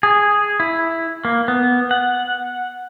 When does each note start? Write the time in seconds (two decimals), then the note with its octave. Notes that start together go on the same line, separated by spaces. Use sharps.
0.03 G#4
0.60 E4
1.25 A#3
1.48 B3
1.91 F#5